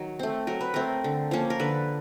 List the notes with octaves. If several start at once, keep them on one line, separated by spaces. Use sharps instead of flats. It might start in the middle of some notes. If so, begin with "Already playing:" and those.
Already playing: D#3 F#3
A3 C4
F#3 A#4
B4
A3 C4 A#4
D3
F3 A#3 C#4
A#4
D3 B4